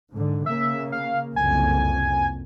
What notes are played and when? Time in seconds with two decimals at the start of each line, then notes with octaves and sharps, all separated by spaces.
0.12 G#2 D3
0.46 C#3 A#3 E5
0.92 F5
1.36 F#1 C2 F2 G#5